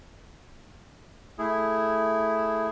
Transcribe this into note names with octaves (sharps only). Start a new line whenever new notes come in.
A3 E4 G#4